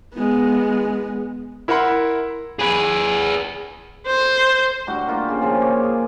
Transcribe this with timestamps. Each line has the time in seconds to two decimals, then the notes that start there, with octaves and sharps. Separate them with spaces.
0.14 G#3 B3
1.68 E4 A#4 E5 F#5 B5 C6
2.59 G#4 B4
4.07 C5
4.87 A2 D3 G3 F#4
5.08 A#3 F4 G4
5.28 C#3 G4
5.41 A#2 C#3 F3
5.61 C#5 D5
5.84 G#4